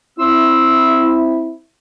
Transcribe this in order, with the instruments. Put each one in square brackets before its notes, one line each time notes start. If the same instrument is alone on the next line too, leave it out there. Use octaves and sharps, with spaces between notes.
[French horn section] C4 E4 [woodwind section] C6 E6